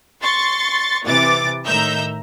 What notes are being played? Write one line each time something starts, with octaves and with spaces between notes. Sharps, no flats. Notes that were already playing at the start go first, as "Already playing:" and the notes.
C6 C#6 A6
C3 E3 D6 A6
A2 D#3 E5 A#5 E6 G6